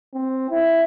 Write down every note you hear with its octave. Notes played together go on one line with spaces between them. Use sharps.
C4
E4